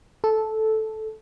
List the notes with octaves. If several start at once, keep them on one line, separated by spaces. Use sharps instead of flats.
A4